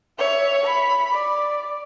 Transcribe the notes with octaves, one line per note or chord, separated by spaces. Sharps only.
C#5 E5
B5
D5